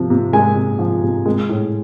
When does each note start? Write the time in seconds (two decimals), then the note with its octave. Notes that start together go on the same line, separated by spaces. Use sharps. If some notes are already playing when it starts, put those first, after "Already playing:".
Already playing: C3 F3
0.10 C3
0.33 G#3 G#5
0.56 C3
0.79 F3
1.02 C3
1.25 G#3
1.49 A2